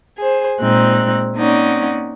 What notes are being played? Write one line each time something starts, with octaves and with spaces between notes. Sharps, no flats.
G#4 C5
A#2 G#3 C4 D#4 F#6
A#3 C4 C#4 D#4 D5 F#5